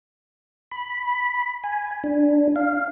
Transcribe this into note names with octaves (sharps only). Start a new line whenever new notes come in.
B5
G#5
D4
F5